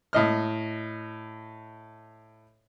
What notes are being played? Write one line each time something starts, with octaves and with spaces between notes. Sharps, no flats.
A2 D#5 F6